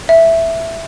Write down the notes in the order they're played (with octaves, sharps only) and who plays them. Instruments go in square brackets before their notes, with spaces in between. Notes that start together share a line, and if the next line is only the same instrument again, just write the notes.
[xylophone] E5